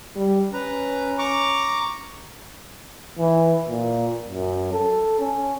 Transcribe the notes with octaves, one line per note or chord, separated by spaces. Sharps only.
G3
C#4 B4 A#5
A#5 C#6 D6
E3
A#2
F#2
A4
C#4